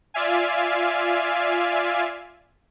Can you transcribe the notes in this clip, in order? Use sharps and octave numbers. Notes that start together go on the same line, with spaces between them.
F4 D5 E5 F5 G#5